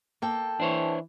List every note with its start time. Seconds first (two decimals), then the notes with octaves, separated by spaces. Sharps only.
0.22 A#3 A4 G5
0.60 E3 D4 C5 C#5